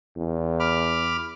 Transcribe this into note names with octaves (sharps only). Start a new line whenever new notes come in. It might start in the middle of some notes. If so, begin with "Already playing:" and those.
E2
B5 D6 F6